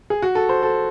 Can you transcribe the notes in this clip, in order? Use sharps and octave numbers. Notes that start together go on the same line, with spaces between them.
G#4
F#4
A4
C5
A4